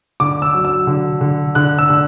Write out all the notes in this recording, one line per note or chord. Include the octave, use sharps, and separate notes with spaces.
D3 D6
E6
F#3
E6
D3
D3
D3 F#6
E6
D3